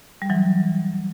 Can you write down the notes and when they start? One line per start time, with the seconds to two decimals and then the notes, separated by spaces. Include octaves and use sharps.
0.22 G3
0.30 E3 F#3